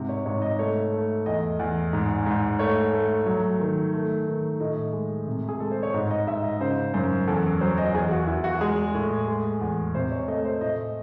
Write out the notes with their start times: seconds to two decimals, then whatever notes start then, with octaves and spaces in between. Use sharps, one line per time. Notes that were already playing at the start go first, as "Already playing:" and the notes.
Already playing: G#2 C3
0.09 C#5
0.26 G#2 C#5
0.42 D#5
0.59 A3 C#5
0.93 A3
1.26 E2 D#5
1.59 E2
1.93 G#2
2.26 G#2
2.59 A3 C#5
2.93 A3
3.26 F#3
3.60 D#3
3.93 A3
4.27 D#3
4.60 A2 D#5
4.93 G#3
5.27 C3
5.49 G#4
5.60 G#3 A4
5.71 C5
5.83 C#5
5.94 G#2 D#5
6.10 D#5
6.27 G#2 E5
6.44 D#5
6.61 C#3 C5
6.94 F#2 C5
7.28 E2 A4
7.61 F#3 C5
7.78 D#5
7.94 E2 G#4
8.11 F#4
8.27 E2 E4
8.44 F#4
8.61 G#3 G#4
8.94 A2
9.28 G#3
9.61 E2
9.95 C3 C5
10.11 C#5
10.28 A3 D#5
10.45 C5
10.61 A2 D#5